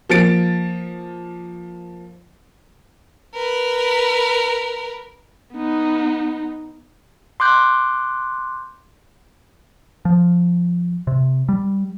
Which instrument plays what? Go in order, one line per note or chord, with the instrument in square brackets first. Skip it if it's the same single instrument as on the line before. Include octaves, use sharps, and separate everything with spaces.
[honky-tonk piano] F3 A#3 A6 D7
[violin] A#4 B4
[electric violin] B3 D#4
[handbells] C6 D6 F#6 G6
[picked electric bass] F3
C3
G3